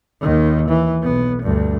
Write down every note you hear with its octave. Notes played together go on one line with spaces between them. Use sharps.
D#2 D#3
E3
B1 B3
D2 G2